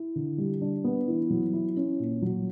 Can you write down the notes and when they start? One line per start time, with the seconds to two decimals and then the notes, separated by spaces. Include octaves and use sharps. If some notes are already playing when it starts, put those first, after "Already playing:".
Already playing: E4
0.15 D3
0.38 G3
0.61 D4
0.84 B3
1.08 E3
1.30 F#3
1.53 E4
1.77 C#4
2.00 A#2
2.22 F#3